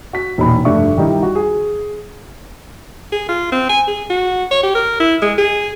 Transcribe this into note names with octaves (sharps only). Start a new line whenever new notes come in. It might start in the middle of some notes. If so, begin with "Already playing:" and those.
F#4 B6
E1 A#2 D#4 B5
F1 G2 A3 D4 E5 C#6
D#3 G3 D#4 E4
F#4
G#4
G#4
F4
C4
G#5
G#4
F#4
C#5
G4
A#4
E4
G#3
G#4